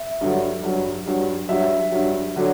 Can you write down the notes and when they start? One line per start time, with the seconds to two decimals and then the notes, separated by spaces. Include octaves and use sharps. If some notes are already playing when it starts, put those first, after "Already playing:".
Already playing: E5
0.21 G2 D3 F#3
0.64 G2 F#3
1.07 G2 F#3
1.49 G2 F#3 E5
1.92 G2 F#3
2.36 D3 F#3